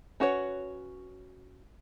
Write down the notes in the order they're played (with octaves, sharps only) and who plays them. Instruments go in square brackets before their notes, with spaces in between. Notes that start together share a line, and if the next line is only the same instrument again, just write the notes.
[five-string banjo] C#4 F#4 B4 C#5